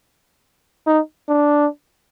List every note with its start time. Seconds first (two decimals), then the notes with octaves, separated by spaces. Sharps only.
0.87 D#4
1.29 D4